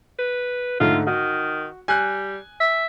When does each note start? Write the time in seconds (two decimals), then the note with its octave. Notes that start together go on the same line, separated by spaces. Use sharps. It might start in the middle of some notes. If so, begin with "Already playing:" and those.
0.18 B4
0.80 G#2 D3 A3 F4
1.07 D#3 F#4
1.88 G3 G#5 F#6
2.60 E5